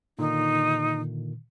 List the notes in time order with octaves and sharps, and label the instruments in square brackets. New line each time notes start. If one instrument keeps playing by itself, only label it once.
[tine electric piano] A#2 D3 D#3 [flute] D#4